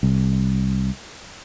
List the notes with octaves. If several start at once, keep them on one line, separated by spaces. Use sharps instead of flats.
C2